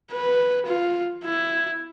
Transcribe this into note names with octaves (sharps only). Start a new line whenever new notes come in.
B4
F4
E4